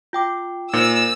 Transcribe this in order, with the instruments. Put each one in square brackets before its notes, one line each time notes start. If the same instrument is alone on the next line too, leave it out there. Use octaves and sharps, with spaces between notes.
[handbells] F4 G5 D6
[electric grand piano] A#2 [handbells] D#4 A#4 C5 [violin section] E6